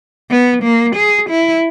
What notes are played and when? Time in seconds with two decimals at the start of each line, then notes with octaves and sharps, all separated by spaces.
0.31 B3
0.63 A#3
0.96 G#4
1.30 E4